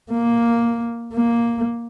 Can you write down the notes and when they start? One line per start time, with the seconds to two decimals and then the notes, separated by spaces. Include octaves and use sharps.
0.11 A#3
1.14 A#3